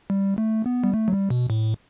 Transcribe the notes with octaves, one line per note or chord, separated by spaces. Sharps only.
G3
A3
B3
G3
A3
F#3
G3
B2
A2